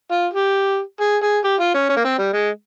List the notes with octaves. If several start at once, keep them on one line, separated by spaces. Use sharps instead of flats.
F4
G4
G#4
G#4
G4
F4
C#4
C#4
A#3
C4
G3
G#3